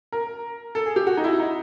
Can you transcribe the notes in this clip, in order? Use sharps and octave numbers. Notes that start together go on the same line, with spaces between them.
A#4
A4
G#4
G4
F#4
D#4
E4
D#4